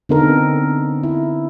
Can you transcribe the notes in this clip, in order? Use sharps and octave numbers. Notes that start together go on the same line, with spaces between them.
D3 B3 C4 D#4 A4 A#4
E4